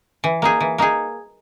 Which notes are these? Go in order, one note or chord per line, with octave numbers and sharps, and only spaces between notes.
E3
A#3 D#4 G#4
E3
A#3 D#4 G#4